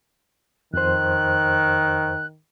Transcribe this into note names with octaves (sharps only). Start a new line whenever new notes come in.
F2 D#3 C5 F#6